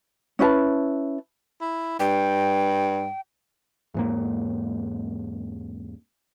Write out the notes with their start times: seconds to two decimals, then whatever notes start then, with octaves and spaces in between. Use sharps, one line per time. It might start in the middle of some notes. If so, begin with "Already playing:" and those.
0.39 C#4 E4 B4 A5
1.61 E4
2.00 G2 G5
3.94 E2 G#2 A#3